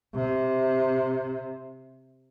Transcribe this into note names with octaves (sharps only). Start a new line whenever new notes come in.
C3